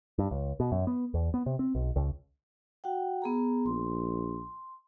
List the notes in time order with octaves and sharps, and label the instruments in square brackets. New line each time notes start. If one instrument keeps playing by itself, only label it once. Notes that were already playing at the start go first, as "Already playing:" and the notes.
[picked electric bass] G2
C#2
B2
F#2
B3
E2
B3
C3
C4
B1
C#2
[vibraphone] F#4 F#5 G5
B3 G#4 A#5
[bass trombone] A#1 [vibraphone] C6